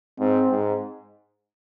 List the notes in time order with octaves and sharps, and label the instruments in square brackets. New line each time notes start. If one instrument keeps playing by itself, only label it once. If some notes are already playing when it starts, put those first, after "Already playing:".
[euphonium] G#2 [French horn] C4
[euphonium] G#2